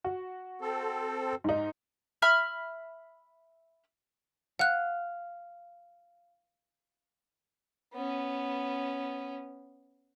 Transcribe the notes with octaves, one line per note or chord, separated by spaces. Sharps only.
F#4
C4 A4
G#2 D#4
E5 B5 F6
F5 F#5 F#6
B3 C#4